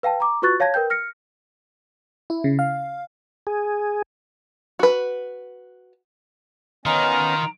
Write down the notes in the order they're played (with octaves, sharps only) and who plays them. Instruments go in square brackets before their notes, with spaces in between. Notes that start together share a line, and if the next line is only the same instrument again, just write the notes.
[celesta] B4 F5 G5 A5
A#5 D6
F4 F#4 B4 C#6 F#6 A6
C#5 F5 A5 G#6 A#6
A#4 B4 G5 G6
F6 A#6 C#7
[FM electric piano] E4
C#3
F5
[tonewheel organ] G#4
[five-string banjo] F#4 B4
[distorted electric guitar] D#3 [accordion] B3 C#4 D#5 [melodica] F4 F5 [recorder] A#5